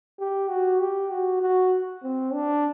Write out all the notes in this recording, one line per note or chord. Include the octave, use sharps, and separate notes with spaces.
G4
F#4
G4
F#4
F#4
C4
D4